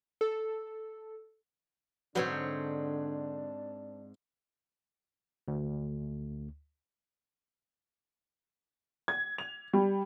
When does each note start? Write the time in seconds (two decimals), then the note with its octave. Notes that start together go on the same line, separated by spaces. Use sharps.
0.21 A4
2.15 G#2 D3 F#3 B3 C4 D4 C#5
5.48 D2
9.08 G#6
9.38 F7
9.73 G3